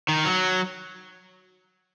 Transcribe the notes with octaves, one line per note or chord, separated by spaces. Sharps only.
D#3
F#3